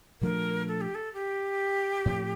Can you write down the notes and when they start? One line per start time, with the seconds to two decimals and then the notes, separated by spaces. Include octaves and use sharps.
0.21 A#2 F3 A3 D4 A#4
0.68 A4
0.81 G4
0.95 A4
1.13 G4
2.05 A2 F3 C4